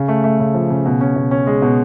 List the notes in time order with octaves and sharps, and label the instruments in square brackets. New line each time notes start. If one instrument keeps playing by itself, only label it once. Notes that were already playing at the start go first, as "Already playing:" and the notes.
Already playing: [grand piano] C#3
A3
A3
C#3
F3
C#3
B2
C#4
B2
C#4
G#3
B2